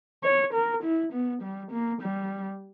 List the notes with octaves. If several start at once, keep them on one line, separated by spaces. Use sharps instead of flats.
C#5
A#4
E4
B3
G3
A#3
G3